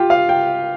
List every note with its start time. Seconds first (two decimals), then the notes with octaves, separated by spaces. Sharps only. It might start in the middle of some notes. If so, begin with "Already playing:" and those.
Already playing: F4 G4
0.10 F5
0.29 G5